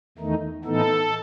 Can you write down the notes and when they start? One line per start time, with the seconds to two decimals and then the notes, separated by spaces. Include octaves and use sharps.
0.18 E2 D#3 A3 D#4
0.64 A2 E3 B3 D#4 A4